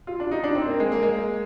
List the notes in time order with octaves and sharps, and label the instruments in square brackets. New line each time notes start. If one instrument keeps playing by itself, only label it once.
[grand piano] F4
D4
D#4
D4
C4
A#3
G#3
A#3
G#3